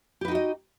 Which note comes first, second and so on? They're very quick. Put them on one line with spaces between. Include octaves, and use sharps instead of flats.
G4 B4 D#4 F#4 D#5